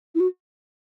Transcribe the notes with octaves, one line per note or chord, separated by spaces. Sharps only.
E4
F#4